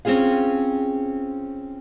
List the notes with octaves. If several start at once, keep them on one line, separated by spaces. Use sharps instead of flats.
C4 C#4 F4 G#4 F5